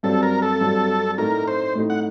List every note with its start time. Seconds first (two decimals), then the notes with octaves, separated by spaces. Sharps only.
0.03 G2 F#3 C4 A4
0.23 A#4
0.42 A4
0.61 G2 F#3 C4
1.18 A2 A3 D#4 A#4
1.48 C5
1.75 A2 A3 D#4
1.90 F#5